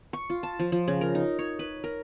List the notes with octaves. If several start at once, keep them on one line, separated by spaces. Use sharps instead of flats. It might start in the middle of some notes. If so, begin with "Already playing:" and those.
C#6
F4
A5
F3
F3
C#3
A#4
D#4
C#5
B4
A#4